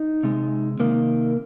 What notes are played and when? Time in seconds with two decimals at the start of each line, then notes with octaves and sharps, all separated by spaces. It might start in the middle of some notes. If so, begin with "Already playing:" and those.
Already playing: D#4
0.23 C3 G#3
0.79 C3 D#3 A#3